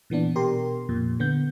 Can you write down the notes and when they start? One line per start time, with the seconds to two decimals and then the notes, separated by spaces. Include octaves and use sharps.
0.10 A#2 E3 B3 D4
0.36 B2 G4 A#4 C6
0.89 F2 A#2
1.20 D3 B3 G6